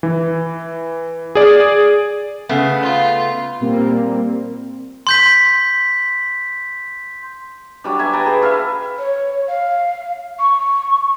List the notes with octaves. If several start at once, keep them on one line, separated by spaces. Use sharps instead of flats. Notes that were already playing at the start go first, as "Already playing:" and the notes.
E3
G#4 D5
C#3 A3 B3
F4
A#2 G3 A#3 C4
C6 G6 B6
F#3 G3 D4
E5 G#5 A#5
B4 G5 A5 A#5
G#4
E5 F5 B5
C#5
F5
C#6